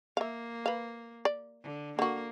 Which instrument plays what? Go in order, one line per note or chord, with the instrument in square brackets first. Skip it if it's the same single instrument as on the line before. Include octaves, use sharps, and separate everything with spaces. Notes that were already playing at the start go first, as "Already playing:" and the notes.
[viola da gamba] A#3 [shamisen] E5 F5
[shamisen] B4 F5
D5
[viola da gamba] D3
[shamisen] D3 F#4 [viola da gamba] A#3